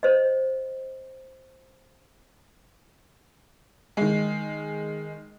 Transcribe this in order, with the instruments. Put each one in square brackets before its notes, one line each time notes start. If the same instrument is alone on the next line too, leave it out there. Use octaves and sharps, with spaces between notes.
[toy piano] C5 D#5
[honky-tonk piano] D#3 G#3